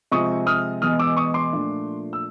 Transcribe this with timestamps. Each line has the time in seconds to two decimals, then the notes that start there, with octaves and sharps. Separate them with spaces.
0.11 C3 F3 G#3 C4 C#6 D#6
0.47 D#6 F6
0.82 E2 B2 G#3 D#6 F6
0.99 D6 E6
1.17 C#6 D#6
1.34 C6 D6
1.52 A#2 F3 A3 D4
2.13 E6